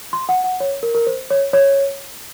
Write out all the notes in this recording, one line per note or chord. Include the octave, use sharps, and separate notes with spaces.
C6
F#5
F#5
C#5
A#4
A#4
C5
C#5
C#5